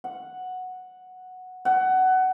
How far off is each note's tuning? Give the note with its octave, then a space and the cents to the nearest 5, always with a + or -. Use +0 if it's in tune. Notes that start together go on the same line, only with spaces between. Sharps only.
F#5 -5
F#5 +15